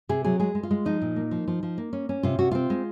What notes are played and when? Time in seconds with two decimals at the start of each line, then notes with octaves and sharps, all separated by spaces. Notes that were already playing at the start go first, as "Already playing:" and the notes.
0.09 C3 G#4
0.25 F#3 G#4
0.40 G#3 G#4
0.55 G#3
0.63 F4
0.71 G#3
0.85 F3 D#4
1.02 A#2
1.16 A#3
1.31 F3
1.48 F3
1.63 F3
1.78 A#3
1.93 C#4
2.09 C#4
2.23 C3 F4
2.38 C3 F#4
2.51 C4 F4
2.70 G#3